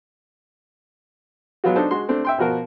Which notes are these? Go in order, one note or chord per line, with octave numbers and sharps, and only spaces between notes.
F#3 G#3 B3 F4 F#4
D4 D#4 A4 C5
G#3 F#4 C6
A3 C4 D4
E5 G5 C6
B2 F3 F#4 A#4